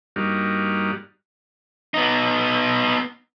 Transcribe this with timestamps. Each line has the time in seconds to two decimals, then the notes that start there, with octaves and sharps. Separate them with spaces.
0.16 G2 G3 A#3 D#4 F#4
1.94 B3 D#4